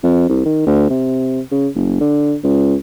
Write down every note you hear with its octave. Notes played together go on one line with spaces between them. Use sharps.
F2
C2
D#3
D2
C3
C#3
F#1
D3
C#2